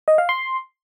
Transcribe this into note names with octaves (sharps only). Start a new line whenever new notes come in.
D#5
F5
C6